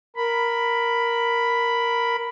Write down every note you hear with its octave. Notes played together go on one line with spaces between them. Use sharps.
A#4 B5